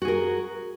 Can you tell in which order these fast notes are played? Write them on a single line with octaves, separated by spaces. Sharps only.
F#4 G#4 A#4